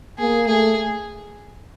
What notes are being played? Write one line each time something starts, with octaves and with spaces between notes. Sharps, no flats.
A#3 G#4
A3 G#4